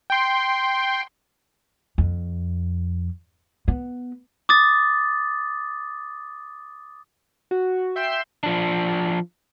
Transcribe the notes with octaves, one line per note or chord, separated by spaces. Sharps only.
G5 C6
F2
B3
D6 D#6 A6
F#4
E5 G5 C6 G6 C7 E7
F3 D4